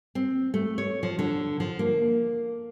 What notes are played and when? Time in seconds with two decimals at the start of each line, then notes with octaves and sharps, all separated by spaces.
0.15 C4
0.54 A3
0.78 C#5
1.03 F3
1.19 D3
1.60 F3
1.79 A#3